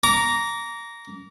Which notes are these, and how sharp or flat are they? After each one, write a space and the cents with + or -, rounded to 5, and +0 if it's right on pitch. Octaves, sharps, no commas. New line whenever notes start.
A#5 +0 D6 -35